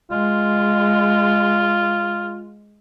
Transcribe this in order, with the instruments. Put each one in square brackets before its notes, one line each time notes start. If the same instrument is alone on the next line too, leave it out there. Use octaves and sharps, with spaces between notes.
[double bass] G#3 [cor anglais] F4